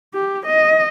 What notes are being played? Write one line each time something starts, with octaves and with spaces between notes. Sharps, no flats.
G4
D#5